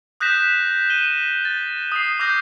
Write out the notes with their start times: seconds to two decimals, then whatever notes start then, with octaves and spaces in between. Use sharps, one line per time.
0.20 D#6 F#6 G6 A#6 B6 E7
0.90 D#7 G7
1.45 A6
1.92 D#6 C7
2.19 D6 D#6 F6 G6 A#6